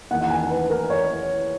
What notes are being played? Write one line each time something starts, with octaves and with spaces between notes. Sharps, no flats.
E2 D#3 A#3 F#5
F#5
G#5
B4
A#4
C#5